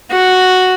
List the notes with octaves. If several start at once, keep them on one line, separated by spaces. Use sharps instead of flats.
F#4